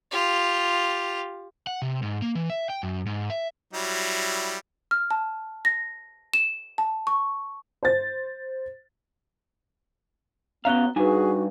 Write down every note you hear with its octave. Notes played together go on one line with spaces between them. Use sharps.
F4 G4
F#5
C3
G#2
A#3
E3
E5
G5
F#2
G#2
E5
F#3 G3 E4
F6
A5
A#6
E7
A5
C#6
C5 A6
B2 B3 C#4 F5 A#5 F#6 G7
G2 D#4 F#4 G#4 B4 G#5